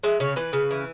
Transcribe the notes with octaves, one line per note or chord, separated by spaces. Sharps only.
G#3 E5
C#3 C#5
E3 B4
C#3
E3